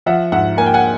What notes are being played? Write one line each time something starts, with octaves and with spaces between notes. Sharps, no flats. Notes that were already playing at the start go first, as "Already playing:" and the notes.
F3 E5 F#5
G#2 E5 F#5
A#3 G#5
G5
F#5 G#5